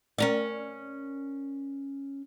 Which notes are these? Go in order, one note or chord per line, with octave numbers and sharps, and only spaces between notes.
C#4 A#4 D5